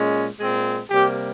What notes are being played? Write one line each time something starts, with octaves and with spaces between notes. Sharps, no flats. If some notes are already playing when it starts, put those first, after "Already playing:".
Already playing: A#2 G#3 C#4
A#2 G#3 C4
C3 G3 A#3 G4